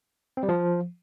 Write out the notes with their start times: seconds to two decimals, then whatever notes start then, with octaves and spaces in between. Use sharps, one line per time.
0.37 C4
0.43 G3
0.49 F3